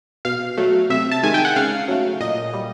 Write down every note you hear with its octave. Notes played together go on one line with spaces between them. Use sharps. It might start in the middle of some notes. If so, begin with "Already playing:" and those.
B2 F5
F#3 A3
C3 E5
A5
D#3 G#3 G#5
G5
F#5
C#3 F5
F#3 A3
A#2 D#5
G3